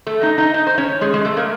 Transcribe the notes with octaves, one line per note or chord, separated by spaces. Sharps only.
A3 A4
D#4 D#5
D#4 D#5
D#4 D#5
C5
C#4 C#5
G#3 G#4
G#3 G#4
A3 A4
A#3 A#4